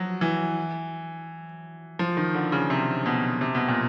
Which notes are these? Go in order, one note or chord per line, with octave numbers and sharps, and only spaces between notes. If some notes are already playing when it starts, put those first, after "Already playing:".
Already playing: F3 F#3
E3
F3
D#3
D3
C#3
C3
B2
C3
B2
A#2